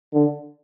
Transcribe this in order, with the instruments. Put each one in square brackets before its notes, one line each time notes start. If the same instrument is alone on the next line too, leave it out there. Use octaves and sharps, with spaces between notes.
[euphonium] D3